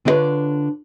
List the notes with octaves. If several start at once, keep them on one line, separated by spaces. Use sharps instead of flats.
D3 D4 E4 F4 B4 C#5